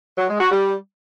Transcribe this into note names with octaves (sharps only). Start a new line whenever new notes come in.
F#3
G#3
F#4
G3